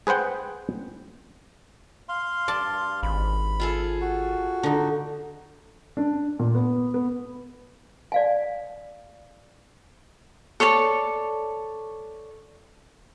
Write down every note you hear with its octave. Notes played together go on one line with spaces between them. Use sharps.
G#4 B4 C5 F#5 G5
F5 C6
G2 D5 A5
G#1 B5
F4 G#4 A4
F#4
D3 D#4
D4
A#2
B3
B3
D5 F5 G#5
A4 C#5 D5 A5